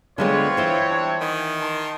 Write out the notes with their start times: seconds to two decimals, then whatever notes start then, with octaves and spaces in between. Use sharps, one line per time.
0.18 D3 G#3 B3 C4 F4 B4 C#5
0.57 E3 E4 C5
0.89 G3 D4 E5
1.21 D#3 F#5 G#5 B5
1.62 A5 A#5 C6